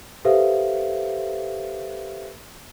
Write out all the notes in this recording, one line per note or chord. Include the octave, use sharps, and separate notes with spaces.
G4 A4 B4 C5 E5 F5